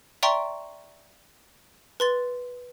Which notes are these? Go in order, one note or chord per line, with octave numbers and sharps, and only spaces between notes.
D5 E5 G5 A#5 C6 C#6
B4 C6 A6